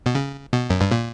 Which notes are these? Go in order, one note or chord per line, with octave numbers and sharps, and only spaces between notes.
B2
C#3
B2
F#2
G2
A#2